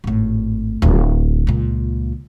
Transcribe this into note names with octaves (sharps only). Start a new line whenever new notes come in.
G#1 A2
D1
C#2 A#2